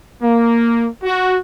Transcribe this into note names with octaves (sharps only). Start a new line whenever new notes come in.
A#3
F#4